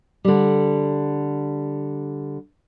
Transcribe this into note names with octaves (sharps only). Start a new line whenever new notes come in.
D3 G3